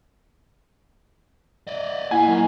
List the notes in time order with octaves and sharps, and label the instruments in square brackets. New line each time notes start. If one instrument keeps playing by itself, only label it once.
[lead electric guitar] D5 D#5
[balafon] A#3 [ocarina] E4 [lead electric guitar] D#5 F#5 [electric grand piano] G#5
[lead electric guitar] F#3 A#4